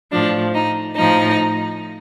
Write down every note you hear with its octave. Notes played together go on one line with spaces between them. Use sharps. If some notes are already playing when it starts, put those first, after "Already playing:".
A2 F3 D4
D#4
A2 F3 D#4